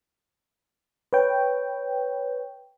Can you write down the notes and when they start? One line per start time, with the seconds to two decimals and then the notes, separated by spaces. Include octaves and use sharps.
1.13 B4 C#5 G5